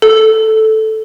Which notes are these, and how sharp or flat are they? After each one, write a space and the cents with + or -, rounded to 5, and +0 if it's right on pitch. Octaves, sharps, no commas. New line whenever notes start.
A4 -5